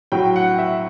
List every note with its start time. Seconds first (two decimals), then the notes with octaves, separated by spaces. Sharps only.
0.12 A2 F#3 G5
0.36 F#5
0.58 E5